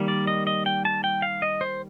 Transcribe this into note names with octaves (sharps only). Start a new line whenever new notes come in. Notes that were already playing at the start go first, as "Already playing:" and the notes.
Already playing: D#3 G3 A#3
D5
D#5
D#5
G5
A5
G5
F5
D#5
C5